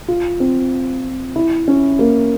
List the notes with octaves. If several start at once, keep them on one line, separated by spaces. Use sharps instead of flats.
F4
C4
E4
C#4
A#3